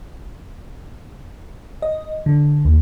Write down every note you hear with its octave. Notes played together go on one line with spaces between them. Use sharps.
D#5
D3
D#2